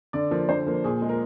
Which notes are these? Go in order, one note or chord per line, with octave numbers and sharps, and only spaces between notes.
D3 D5
F3 A#3
D3 C5
F3 A#3
A#2 G#4
G#3
A#4